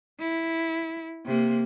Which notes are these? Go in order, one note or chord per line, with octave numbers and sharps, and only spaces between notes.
E4
C3 A#3